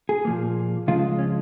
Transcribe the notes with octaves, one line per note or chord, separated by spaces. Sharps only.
G#4
A#2 F3 A#3
C#2 C#3 F3 G#3 F4
C#4